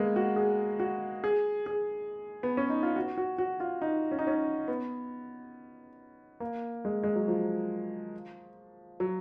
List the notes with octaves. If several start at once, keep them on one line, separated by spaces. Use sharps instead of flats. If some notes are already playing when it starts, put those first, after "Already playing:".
Already playing: G#3 A#3 B3
F#4
G#4
F#4
G#4
G#4
B3
C#4
D#4
F4
F#4
F#4
F#4
F4
D#4
C#4
D#4
C#4
B3
A#3
G#3
G#3
F#3
F3
F#3